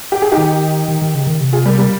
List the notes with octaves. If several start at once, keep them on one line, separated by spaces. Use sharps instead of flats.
G4
G#4
D#4 G4
D#3
D#3
D#3
C#3
D#3
C3
F4 G#4
G3 A#3
G3 A#3